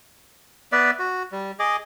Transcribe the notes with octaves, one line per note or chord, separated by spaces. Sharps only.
B3 B4 D5 E5
F#4
G3
G#4 D#5 D6